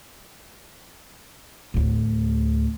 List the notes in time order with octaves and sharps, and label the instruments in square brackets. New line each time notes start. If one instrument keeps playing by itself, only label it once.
[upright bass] D2 A2